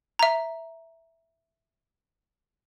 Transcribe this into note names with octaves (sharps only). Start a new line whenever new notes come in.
E5 A#5